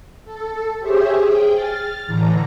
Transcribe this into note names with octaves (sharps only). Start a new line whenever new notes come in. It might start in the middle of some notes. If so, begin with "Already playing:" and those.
A4
G4 G#4 C5 C#5 E5
G#4 G5
F6 A6
A2 D3 E3 A#5